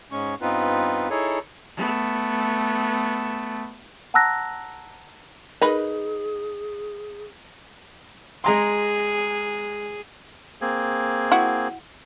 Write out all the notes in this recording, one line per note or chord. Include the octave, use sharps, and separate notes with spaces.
G#2 G#3 C#4 C#6
G2 B3 C4 D#4 F4 B4
D#4 E4 G#4 A4 C#5
A3 B3
F#5 A5 A#5 E6 F#6 A#6
D#4 G#4 A#4 B4 B5
G#3 G#4 A#5 C6
A#3 C4 G#4
E4 F#4